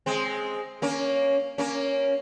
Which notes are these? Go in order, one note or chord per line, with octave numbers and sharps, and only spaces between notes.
G#3 C4
A#3 C#4
A#3 C#4